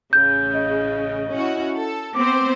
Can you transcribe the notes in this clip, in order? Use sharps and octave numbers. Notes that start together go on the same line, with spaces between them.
A1 C#3 G6
D#5
C#4 E4 F#4
A4
B3 C4 C5 D6